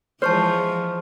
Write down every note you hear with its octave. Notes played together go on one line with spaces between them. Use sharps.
E3 F3 G#3 C5 A5 C#6 F6